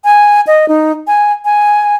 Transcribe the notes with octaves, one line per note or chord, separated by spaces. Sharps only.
G#5
D#5
D#4
G#5
G#5